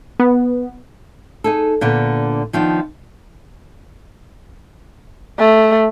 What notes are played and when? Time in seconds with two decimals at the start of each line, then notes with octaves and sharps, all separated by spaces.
0.20 B3
1.44 D#4 G#4 A4
1.81 A#2 D3 B3
2.53 D#3 F3 B3 D4
5.39 A3